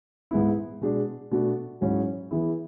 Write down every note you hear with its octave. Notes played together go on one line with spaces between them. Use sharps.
G#2 G#3 B3 E4
B2 G#3 D4
B2 A3 D4 F#4
G#2 F#3 C#4 E4 G#4
E3 B3 E4 G#4